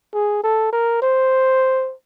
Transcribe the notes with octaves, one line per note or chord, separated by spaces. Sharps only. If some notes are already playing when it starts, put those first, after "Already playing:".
G#4
A4
A#4
C5